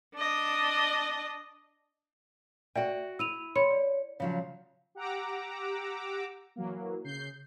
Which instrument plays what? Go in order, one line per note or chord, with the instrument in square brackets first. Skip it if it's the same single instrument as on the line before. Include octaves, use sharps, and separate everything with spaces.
[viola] D4 D#5
[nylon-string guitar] F#4 F#5 G5 [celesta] D5 E5
[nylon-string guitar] E4 [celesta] E6 D#7 F7
[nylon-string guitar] C#5 [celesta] B5 C6 C#7
[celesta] D5
[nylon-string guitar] C#3 F3 F#3
[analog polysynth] G4 F#5 A#5 D6 E6
E3 F#3 A#3
C#3 G6 C7